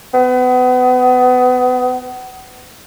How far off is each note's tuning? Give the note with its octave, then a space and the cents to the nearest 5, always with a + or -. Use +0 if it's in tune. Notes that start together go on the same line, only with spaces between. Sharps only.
B3 +30